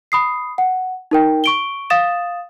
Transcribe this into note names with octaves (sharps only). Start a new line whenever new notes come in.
B5 D#6 C7
F#5
D#4 A#4 G5
C#6 D7 G7
F5 D#6 A6 E7